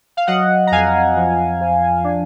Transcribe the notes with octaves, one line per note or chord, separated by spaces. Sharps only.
F5
F#3 D#5 F#5
A#5
F2 F5 G#5
F3
F3
D4